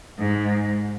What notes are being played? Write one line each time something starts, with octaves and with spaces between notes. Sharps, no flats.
G#2